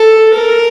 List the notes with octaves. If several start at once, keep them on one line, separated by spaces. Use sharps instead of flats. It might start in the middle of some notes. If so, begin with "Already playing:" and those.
Already playing: A4
A#4